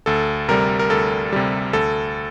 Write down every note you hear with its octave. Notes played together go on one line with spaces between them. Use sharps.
D2 A4
C3 G3 A#4
A#4
D2 A4
C3 G3
D2 A4